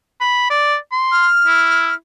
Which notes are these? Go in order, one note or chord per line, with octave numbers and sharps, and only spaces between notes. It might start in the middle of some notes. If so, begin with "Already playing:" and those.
B5
D5
C6
F6
E4